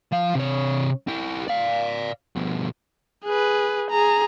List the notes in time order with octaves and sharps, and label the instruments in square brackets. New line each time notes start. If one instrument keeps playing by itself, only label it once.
[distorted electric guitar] F3 F5
C3 C#5
E4 G4
D5 F5
B2 F3
[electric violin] G#4 B4
G#4 A#5